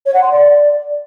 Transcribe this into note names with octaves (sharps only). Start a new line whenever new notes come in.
C#5
F#5
C6
D5